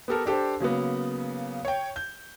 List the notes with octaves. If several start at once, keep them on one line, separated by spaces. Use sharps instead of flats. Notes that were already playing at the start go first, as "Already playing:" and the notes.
B3 G4 A4 A#4
D4 G4 A4 C5
C#3 F#3 A#3 B3
C#5 G5
G6